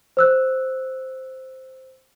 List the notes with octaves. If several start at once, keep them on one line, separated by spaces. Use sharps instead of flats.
C5 E6 F#6